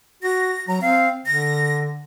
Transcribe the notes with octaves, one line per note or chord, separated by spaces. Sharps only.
F#4 A#6
F#3 A#5
C4 F5
D3 A#6